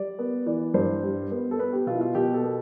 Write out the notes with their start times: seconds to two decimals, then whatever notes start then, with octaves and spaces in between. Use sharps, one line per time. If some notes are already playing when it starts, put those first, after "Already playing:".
Already playing: G3 D5
0.19 B3
0.46 E3 D5
0.74 G2 C5
1.03 G3
1.31 B3
1.51 A4
1.59 B3 B4
1.73 G4
1.87 B2 F4
1.95 E4
2.01 F4
2.15 B2 G4
2.34 A4
2.44 B3